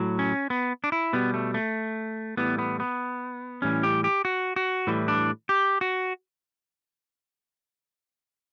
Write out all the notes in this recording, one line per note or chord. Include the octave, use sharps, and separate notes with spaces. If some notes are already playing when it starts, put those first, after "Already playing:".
Already playing: A2 F#3
C#4
B3
D4
E4
B2 G3 B3
A3
A3
A2 E3 G3 B3
B3
B3
A2 E3 G3 C#4
G4
G4
F#4
F#4
A2 E3 G3
D4
G4
F#4